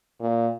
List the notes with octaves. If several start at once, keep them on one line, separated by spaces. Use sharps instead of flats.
A#2